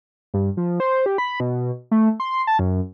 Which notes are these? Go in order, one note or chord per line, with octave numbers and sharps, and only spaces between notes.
G2
F3
C5
G4
B5
B2
A3
C6
A5
F#2